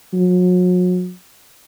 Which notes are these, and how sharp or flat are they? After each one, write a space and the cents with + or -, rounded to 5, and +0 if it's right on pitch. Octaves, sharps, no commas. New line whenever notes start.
F#3 -40